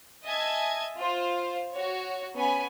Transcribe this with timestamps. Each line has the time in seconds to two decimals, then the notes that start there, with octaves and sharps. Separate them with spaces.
0.24 D#5 E5 G#5 A5 G#6
0.98 F4 C5 F5
1.72 F#4 C#5
2.36 B3 C#4 C#5 G#5 B5